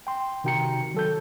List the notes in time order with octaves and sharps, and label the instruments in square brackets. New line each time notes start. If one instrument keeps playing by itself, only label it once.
[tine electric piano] G5 C6
C3 D#3 F#4 G5 A#5 C#7
F#3 A4 G6